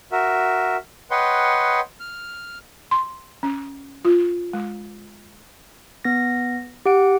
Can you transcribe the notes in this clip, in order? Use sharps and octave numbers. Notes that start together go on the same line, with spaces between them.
F#4 A#4 E5
B4 C#5 D#5 F#5 G5 C6
F6
C6
C#4
F4
G#3
B3 A#6
G4 F#5 D7